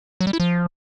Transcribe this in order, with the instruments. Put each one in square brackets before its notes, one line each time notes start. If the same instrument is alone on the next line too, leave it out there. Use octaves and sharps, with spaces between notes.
[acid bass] F#3
G3
E4
F3